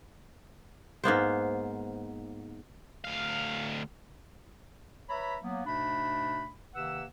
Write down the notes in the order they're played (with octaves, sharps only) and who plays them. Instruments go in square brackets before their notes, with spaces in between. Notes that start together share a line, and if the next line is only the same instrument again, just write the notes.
[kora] G#2 A#3 B3 C5
[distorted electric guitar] D2 F5
[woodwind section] B4 C#5 E5 A#5 B5
F#3 A#3 B3
G#2 B2 A3 D4 B5
C3 D#3 A#3 B4 F#5 E6